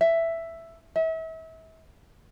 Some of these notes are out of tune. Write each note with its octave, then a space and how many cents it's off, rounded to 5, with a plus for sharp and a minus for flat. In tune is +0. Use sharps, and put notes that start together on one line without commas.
E5 +5
E5 -35